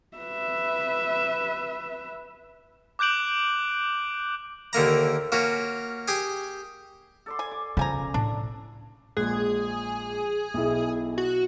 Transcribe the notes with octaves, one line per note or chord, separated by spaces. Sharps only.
B4 E5
D6 F#6 G6 D7 F#7
D#2 D3 A#3 A#5
A#3 C#4 F#4
G4 G#4 G#5
A4 D5 C6
G#5
D6
C#3 F3 C#4 G#5 A#5
A2 D4
A#1 G#3 G#4 F#6
B1 E4
F#4